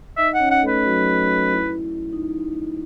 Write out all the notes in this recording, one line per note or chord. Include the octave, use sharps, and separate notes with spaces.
D#4 D#5 E5
F#5
C#4 C#5
F#5
A3 A4
B4
F#3 F#4
E4
D#4